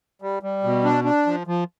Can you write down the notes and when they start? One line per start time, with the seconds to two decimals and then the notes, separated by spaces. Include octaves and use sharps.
0.22 G3
0.43 G3
0.64 B2
0.84 D4
1.04 D4
1.26 F3
1.47 F3